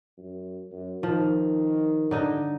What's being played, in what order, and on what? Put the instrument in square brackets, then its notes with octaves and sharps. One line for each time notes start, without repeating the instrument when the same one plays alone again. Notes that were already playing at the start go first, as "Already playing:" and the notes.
[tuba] F#2
F#2
[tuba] D#3 [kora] F3
[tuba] G2 [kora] D3 D#4 D#5